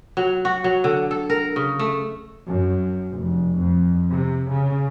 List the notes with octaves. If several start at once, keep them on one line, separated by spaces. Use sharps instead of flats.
F#3
F#4
F#3
D3
A4
A#4
C#3
A3
F#2
F1
F2
C3
C#3